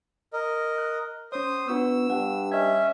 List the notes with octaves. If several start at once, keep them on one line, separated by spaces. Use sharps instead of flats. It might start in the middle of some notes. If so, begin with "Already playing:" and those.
A#4 D#5
F#6
C#4 C5 C#5 D#6
B3 D4 F4 C#6 E6
G2 F#5
C#4 D#5 E5 G#6